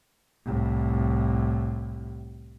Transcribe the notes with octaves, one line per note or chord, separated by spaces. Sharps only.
C2 A2